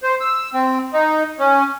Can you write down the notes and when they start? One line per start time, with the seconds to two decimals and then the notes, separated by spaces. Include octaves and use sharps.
0.03 C5
0.21 E6
0.54 C4
0.93 D#4
1.39 C#4